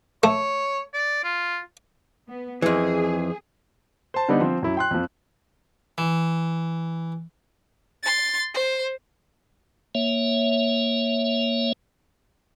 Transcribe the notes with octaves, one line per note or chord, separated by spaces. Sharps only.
A3 C#5
D5
F4
B3
F2 E3 G#4
C5 A5
D3 G3 B3 D4 D#4
F3 C4
F#2 E4
G5 C6 F#6
F2 F3
E3
C6 A6
C5
A#3 C#5 E5